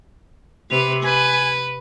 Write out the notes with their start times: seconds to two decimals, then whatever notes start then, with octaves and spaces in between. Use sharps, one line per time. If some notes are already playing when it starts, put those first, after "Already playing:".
0.71 C3 B4 F7
1.03 B4 G#5